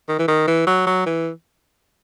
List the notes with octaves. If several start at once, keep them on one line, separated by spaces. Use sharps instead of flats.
D#3
E3
D#3
E3
F#3
F#3
E3